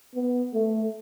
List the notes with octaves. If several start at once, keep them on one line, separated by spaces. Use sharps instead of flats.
B3
A3